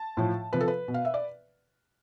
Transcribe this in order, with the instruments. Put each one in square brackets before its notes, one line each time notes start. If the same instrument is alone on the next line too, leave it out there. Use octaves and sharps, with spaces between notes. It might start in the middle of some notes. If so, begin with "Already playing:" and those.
Already playing: [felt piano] A5
A2 F3
C3 F3 B4
A4
B4
B2
F5
E5
D5